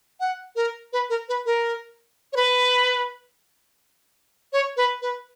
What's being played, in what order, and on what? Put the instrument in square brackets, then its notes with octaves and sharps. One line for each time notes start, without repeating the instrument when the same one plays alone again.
[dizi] F#5
A#4
B4
A#4
B4
A#4
C#5
B4
C#5
B4
B4